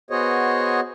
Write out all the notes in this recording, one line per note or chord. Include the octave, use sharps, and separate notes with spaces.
B3 F#4 G#4 C5 C#5 D#5